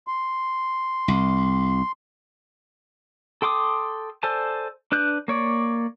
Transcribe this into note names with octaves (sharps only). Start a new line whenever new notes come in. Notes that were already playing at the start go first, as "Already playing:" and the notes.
C6
C2
A4 G5 C6 D6 D#6
A4 C5 D5 G#5 A5
D4 B4 F#6 G6
A#3 C#5 D5